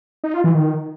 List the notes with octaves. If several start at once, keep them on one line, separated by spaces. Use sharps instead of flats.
D#4
F4
E3
D#3